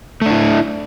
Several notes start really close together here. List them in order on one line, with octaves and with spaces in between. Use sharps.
A3 D4 E4